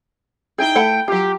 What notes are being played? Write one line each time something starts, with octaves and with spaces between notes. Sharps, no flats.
D#4 E4 G#4 G5
A3 E4 F#5
F#3 F4 G4